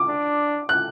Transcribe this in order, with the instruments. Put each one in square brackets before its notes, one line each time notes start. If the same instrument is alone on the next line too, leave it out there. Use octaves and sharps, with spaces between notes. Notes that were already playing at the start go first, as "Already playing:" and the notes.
Already playing: [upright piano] D6
[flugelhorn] D4
[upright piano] F#6